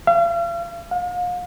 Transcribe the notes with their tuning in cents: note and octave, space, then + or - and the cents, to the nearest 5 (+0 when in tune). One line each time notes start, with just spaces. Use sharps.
F5 -40
F5 +40